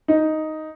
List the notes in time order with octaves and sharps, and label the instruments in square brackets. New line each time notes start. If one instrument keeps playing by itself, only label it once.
[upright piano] D#4